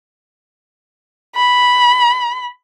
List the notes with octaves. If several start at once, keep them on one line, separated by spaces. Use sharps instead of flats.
B5